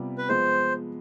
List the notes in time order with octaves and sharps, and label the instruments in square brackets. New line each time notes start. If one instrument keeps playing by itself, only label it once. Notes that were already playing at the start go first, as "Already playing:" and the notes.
Already playing: [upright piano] C3 G3 B3 F4
[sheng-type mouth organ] B4
[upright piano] F3 G#3 B3 [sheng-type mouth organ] C5